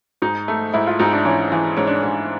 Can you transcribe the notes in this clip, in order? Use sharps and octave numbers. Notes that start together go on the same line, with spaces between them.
G#2 D#4
A3
G#2 E4
F4
G#2 D#4
D4
E3 C#4
E3
G#2 C#4
D4
C#4
G#2